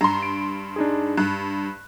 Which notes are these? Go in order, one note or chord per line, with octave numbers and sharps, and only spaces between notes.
G2 A#5 C6
D7
D4 D#4 G#4
G2 F#6